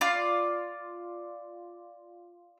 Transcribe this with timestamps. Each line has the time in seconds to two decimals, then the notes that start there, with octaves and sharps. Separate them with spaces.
0.01 F4 D5